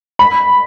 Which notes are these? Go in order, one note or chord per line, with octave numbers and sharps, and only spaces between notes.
B5